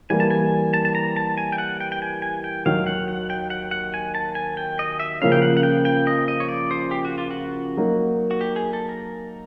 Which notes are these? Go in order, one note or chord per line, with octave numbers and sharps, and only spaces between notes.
E3 G3 A#3 G#5
A5
G#5
A5
A5
A#5
A5
G#5
G5
F#5
G5
G5
G#5
G#5
G5
D#2 D#3 F#3 F5
F#5
F#5
G5
F#5
F#5
G#5
A5
G#5
G5
D#5
E5
C#3 F3 A#3 C#4 F5
G5
F#5
F#5
G5
G5
D#5
D#5
C#5
D5
C5
G4
F#4
F4
F#4
F#3 A#3 D#4
F#4
G4
G#4
A4
A#4